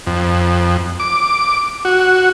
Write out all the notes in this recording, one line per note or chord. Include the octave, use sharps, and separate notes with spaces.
F2
D6
F#4